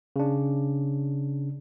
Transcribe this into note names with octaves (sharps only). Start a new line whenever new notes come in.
C#3 D4